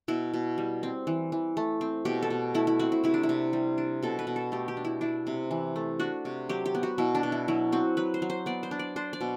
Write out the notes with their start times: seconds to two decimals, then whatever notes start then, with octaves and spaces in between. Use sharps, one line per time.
0.08 B2 E4
0.34 B2
0.58 G3
0.83 C4
1.07 E3
1.32 E3
1.57 A3
1.81 C4
2.05 B2 G4
2.23 A4
2.30 B2
2.54 A3 E4
2.67 E4
2.79 C4 F#4
2.92 E4
3.04 C3 E4
3.14 D4
3.23 E4
3.29 C3
3.53 G3
3.78 D4
4.03 B2 A4
4.19 B4
4.27 B2
4.36 A4
4.52 A3 G4
4.68 G4
4.77 D4
4.85 E4
5.01 D4 E4
5.27 C3
5.51 E3
5.76 A3
6.00 D4 F#4
6.25 C3
6.49 F#3 G4
6.66 G4
6.75 B3
6.83 F#4
6.98 B2 E4
7.15 D4
7.23 B2
7.32 E4
7.48 F#3 E4
7.72 C4 F#4
7.97 F#3 B4
8.14 C5
8.22 F#3
8.30 C5
8.46 B3 D5
8.63 C5
8.71 D4
8.79 D5
8.96 D4 C5
9.13 D5
9.21 B2